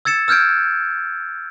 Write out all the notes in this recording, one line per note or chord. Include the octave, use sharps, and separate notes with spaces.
E6 G#6 A6 C#7 E7
E6 F6 G6 G#6 D7